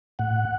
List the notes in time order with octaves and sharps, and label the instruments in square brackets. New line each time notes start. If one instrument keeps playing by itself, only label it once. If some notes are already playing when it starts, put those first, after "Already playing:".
[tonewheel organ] A2 F#5